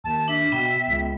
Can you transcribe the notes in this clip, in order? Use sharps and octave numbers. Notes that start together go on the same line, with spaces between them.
D#2 A5
D4 E5
B2 B3 G5
C#2